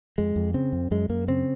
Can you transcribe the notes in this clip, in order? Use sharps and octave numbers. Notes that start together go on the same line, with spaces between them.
F2 G#3
F2
C#3 C4
F2
F#2 G#3
F#2 A#3
C#3 C4